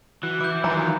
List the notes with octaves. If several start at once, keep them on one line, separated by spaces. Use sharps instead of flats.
E3 F#4
E3 E4 D6 G6
D#3 E3 F#3 F4 A#5